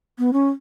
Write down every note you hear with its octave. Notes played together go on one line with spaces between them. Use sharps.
B3
C#4